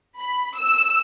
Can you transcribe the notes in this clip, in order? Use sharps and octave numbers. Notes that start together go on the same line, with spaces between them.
B5
E6